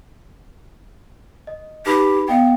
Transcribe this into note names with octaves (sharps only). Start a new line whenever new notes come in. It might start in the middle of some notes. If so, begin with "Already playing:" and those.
D#5
D#4 G4 B4 B5
B3 D#5 F5 G5